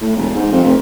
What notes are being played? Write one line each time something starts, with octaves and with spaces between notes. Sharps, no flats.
A2
E1
G#2
F2
F1